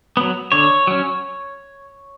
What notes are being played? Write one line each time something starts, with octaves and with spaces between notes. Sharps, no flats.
F#3 B3
D3 C#5
F#3 C#4